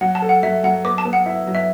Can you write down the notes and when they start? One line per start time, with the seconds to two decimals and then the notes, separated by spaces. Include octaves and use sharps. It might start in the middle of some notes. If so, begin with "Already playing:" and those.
0.01 F#3 F#5
0.15 A5
0.22 A4
0.29 F#5
0.43 F#3 E5
0.64 F#3 F#5
0.85 B3 D6
0.98 A5
1.05 B3
1.13 F#5
1.26 E4 E5
1.47 F#3
1.55 E5